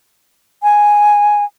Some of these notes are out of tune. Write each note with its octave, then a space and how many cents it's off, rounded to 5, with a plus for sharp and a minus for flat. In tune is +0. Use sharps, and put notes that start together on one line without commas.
G#5 -5